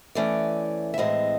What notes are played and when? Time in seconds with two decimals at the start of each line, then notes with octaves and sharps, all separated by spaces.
0.15 E3 A3 C#4 D5
0.94 E5
0.98 A2 E3 G#3 C4 D#5